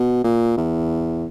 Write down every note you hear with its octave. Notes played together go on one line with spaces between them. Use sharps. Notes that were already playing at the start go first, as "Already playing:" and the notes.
Already playing: B2
A#2
E2